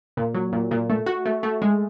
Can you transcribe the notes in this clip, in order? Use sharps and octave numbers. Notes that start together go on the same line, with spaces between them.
A#2
F#3
A#2
A#2
A3
F#4
A3
A3
G#3